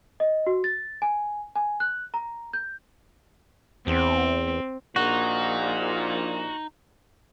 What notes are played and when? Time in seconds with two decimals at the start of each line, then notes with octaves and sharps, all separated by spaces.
0.20 D#5
0.47 F#4
0.64 A6
1.02 G#5
1.56 G#5
1.80 F#6
2.14 A#5
2.53 G6
3.87 E2 C4
4.96 A#1 A#2 D#4 F#4